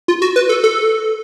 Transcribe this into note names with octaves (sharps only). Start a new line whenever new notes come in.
F4
F#4
B4
A4
A4